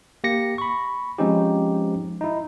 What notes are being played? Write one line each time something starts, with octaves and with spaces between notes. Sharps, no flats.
A#3 G4 A#6 C#7
B5 C#6
F3 G#3 C4 C#4 D#4 G4
D#4 E4